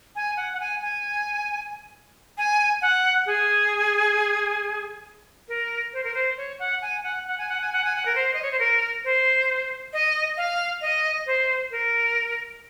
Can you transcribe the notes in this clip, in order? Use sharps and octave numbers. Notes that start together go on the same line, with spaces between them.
G#5
F#5
F#5
G#5
G#5
G#5
F#5
G#4
A#4
C5
A#4
C5
C#5
F#5
G#5
F#5
F#5
G#5
F#5
G#5
F#5
G#5
F#5
A#4
C5
D#5
C#5
C5
A#4
C5
D#5
F5
D#5
C5
A#4